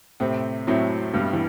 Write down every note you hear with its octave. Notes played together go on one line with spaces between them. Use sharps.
A2 C3 C4
A2 F#3 A3 C4
G2 B2 G3
E3